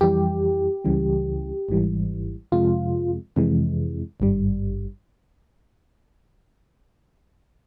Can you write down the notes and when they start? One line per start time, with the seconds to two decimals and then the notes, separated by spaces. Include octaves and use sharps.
0.01 F2 E3 G3 G4
0.85 C#2 C#3 E3 G3
1.69 G#1 G#2 E3 G3
2.52 F2 C3 F3 G#3 F4
3.36 F2 C3 E3 G#3
4.20 G#1 G2 G3